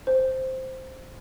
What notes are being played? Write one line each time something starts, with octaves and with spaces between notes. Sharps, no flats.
C5